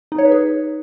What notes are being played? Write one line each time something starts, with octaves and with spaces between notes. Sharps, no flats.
D#4
C#5
B4
G#4